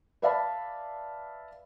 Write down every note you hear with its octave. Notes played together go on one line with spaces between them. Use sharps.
B4 D5 E5 F5 A5 B5